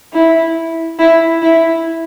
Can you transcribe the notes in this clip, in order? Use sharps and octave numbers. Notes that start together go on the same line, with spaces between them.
E4
E4
E4